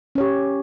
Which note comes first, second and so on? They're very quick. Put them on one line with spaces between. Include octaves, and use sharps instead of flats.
C#4 C#5 G4